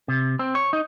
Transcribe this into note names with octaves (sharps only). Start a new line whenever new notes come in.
C3
C4
C#5
D#4